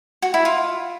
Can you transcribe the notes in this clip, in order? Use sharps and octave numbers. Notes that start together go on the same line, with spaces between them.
F#4
E4
F4